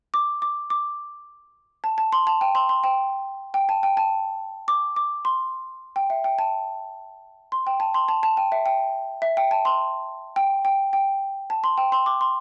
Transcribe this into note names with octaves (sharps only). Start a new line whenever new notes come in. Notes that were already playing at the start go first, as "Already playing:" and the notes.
D6
D6
D6
A5
A5
C6
A5
G5
C6
C6
G5
G5
A5
G5
A5
D6
D6
C6
G5
E5
G5
A5
C6
G5
A5
C6
A5
A5
G5
E5
G5
E5
G5
A5
C6
G5
G5
G5
A5
C6
G5
C6
D6
C6